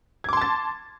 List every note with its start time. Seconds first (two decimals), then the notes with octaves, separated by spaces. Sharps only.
0.24 G#6
0.29 D6
0.33 C6
0.37 A5
0.41 A6